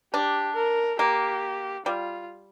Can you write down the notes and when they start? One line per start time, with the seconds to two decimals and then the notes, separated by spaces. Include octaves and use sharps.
0.13 D4 G4
0.56 A#4
0.99 A#3 G4
1.86 G3 F4